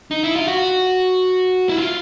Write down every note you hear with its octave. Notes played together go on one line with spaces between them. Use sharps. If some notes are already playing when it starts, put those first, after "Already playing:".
D#4
E4
F4
F#4
E4
F4